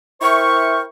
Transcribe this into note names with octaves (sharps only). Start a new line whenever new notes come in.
E4 A#4 C5 E5 G5 C#6